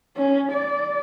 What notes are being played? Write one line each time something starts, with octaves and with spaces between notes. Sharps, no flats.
C#4
D5